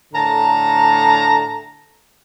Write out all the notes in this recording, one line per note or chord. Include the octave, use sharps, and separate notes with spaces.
A2 D3 A5 A#5